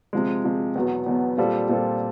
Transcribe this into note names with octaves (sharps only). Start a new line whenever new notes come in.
C3 F3 G#3
C3 F3 G#3
E2 B2 F#3 B3
E2 B2 F#3 B3
A#2 G3 C4 F4 A4
A#2 G3 C4 F4 A4